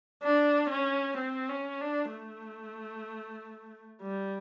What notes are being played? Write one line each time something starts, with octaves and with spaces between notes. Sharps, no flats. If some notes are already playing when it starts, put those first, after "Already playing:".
D4
C#4
C4
C#4
D4
A3
G3